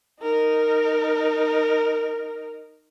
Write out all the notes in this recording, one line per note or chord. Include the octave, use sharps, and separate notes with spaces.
D#4 A#4